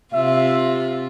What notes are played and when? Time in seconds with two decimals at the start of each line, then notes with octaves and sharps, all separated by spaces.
0.13 C3 F4 E5